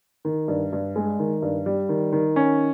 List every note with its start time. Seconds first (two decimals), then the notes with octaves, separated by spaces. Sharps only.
0.25 D#3
0.48 G2
0.73 G2
0.96 G#3
1.19 D#3
1.42 G2
1.66 G3
1.89 D#3
2.12 D#3
2.36 C#4